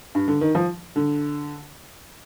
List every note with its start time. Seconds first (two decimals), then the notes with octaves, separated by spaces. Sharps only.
0.15 G2
0.28 D3
0.41 D#3
0.55 F3
0.96 D3